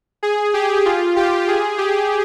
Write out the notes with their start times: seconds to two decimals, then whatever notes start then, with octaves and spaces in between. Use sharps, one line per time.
0.23 G#4
0.54 G4
0.86 F4
1.16 G4
1.48 G#4
1.78 G4